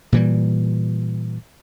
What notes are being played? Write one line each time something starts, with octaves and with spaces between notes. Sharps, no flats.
A#2 E3 G3